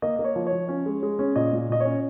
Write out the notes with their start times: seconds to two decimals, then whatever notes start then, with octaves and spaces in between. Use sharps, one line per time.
0.02 A#3 D#5
0.16 A#3 D#5
0.24 C#5
0.36 F3
0.47 C#5
0.52 F3
0.69 C#4
0.86 G#3
1.03 G#3
1.19 C#4
1.36 A#2 D#5
1.53 A#2
1.69 A#2 D#5
1.80 C#5
1.85 C#4